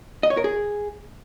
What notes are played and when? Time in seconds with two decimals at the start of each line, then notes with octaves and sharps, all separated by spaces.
0.23 D#5
0.30 C#5
0.37 A#4
0.44 G#4